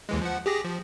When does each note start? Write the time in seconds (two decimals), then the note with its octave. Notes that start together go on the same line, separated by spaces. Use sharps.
0.09 D#2 E3 G#3
0.21 F3 F#5
0.46 G4 G#4 A#6
0.64 F3